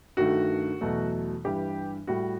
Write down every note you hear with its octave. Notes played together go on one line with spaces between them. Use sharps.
G2 D#3 A3 F#4
E2 B2 F#3 A3
G2 E3 G3 G4
A2 G3 F#4